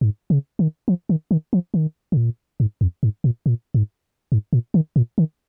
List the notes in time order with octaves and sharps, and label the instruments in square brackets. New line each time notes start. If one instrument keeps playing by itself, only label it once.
[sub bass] G#2
C#3
D#3
F3
D#3
D#3
F3
D#3
C#3
A#2
G#2
F2
G#2
A#2
A#2
G#2
G#2
A#2
D#3
A#2
D#3